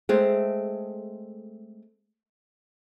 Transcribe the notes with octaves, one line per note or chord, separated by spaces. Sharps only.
G#3 A3 C4